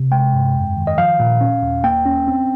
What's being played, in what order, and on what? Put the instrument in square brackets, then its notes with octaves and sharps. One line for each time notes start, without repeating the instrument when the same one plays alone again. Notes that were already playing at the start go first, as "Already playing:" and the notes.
Already playing: [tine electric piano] C3
G#3 G5
G2
F2
D#3
D#5
F3 F5
A#2
C#4
D#2
A#3 G5
C#4
C4